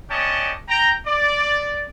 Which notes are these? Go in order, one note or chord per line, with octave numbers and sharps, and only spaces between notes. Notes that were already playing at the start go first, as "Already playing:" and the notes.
B3 C#4 D5 D#5 G5 A5
G5 A#5
D5